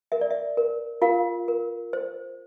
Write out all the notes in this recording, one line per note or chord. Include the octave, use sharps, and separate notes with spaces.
A#4 E5
D5
E5
A#4
F4 A#4 F5
A#4
C5